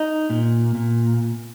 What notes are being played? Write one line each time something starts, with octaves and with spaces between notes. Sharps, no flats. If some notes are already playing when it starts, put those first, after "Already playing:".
Already playing: D#4
A#2
A#2